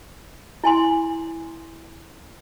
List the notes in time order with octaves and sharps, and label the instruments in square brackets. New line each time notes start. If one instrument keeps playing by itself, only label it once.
[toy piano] E4 G#5 C6